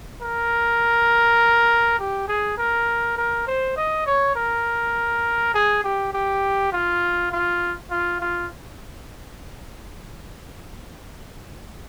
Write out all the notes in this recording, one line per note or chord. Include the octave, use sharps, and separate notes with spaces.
A#4
G4
G#4
A#4
A#4
C5
D#5
C#5
A#4
G#4
G4
G4
F4
F4
F4
F4